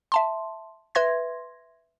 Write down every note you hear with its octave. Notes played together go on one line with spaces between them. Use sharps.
E5 A5 C6
B4 E5 C6 G#6 A#6